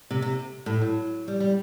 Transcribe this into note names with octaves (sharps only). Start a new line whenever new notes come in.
C3
C3
A2
F#3
G3
G3